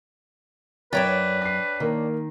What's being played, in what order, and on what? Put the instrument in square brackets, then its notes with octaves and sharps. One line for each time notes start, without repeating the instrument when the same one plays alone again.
[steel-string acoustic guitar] F#2 [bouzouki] D4 C#5 G5 [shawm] B4 [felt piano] A6
[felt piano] B6 C7
[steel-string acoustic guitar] D#3 [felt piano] A#3